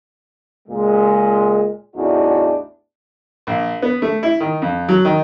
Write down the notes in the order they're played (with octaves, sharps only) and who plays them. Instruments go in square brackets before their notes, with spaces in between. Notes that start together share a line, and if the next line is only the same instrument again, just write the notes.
[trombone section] C#2 A#2 G#3
A1 E2 D4 D#4 F#4
[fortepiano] A#1
B3
A3
E4
D#3
F2
F#3
D#3